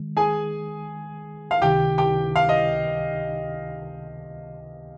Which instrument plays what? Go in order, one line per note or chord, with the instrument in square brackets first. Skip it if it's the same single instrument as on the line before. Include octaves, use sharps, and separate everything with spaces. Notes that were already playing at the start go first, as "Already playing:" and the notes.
Already playing: [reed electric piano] D#3 G#3
[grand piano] G#4 G#5
F5
[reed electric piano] C#2 C3 D#3 [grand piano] G4 G5
[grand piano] G4 G5
F5
D#5